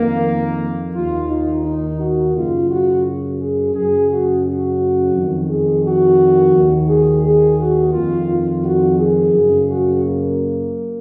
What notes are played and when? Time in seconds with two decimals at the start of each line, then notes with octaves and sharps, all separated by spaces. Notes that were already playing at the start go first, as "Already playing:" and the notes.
Already playing: F2 D#3 A#3
0.94 D#2 D#3 F4
1.29 D#4
1.65 D#4
2.00 F#4
2.34 F#2 C#3 F4
2.69 F#4
3.39 G#4
3.74 F#2 C#3 G#4
4.10 F#4
4.44 F#4
5.14 F2 D#3
5.48 G#4
5.83 F#4
6.54 D#2 D#3
6.88 G#4
7.23 G#4
7.58 F#4
7.93 F2 D#3 F4
8.28 F4
8.63 F#4
8.98 G#4
9.33 F#2 C#3
9.68 F#4
10.03 A#3